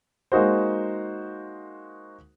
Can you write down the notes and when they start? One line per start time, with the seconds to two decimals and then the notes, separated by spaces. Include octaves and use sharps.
0.32 G#3 A#3 D#4 F#4 C5